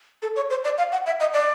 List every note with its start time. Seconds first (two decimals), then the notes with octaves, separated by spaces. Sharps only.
0.22 A4
0.36 C#5
0.50 C5
0.64 D5
0.78 F5
0.92 F#5
1.06 E5
1.20 D#5
1.34 D5